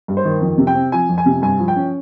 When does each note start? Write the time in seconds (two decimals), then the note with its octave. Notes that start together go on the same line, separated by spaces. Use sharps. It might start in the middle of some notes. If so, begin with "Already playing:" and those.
0.08 G2
0.17 C5
0.25 D#3
0.41 F2
0.58 C3
0.67 G5
0.75 C4
0.92 F3 G#5
1.09 F2
1.18 G#5
1.26 C3
1.42 G2 G#5
1.59 F3
1.68 G5
1.76 C#4